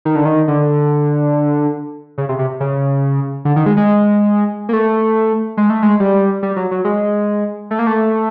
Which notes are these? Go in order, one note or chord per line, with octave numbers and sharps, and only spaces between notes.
D#3
D3
D#3
D3
C#3
C3
C3
C#3
D3
D#3
G#3
G#3
A#3
A3
G#3
A3
G#3
G3
G3
F#3
F#3
G#3
A3
A#3
A3